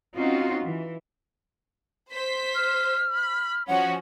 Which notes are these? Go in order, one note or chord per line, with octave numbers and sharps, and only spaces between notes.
C4 C#4 D#4 F4 F#4
E3
C5 B6
F6
B5
F3 C#4 F#4 F#5